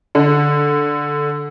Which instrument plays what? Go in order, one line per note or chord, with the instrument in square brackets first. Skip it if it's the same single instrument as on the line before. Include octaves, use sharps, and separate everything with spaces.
[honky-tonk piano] D3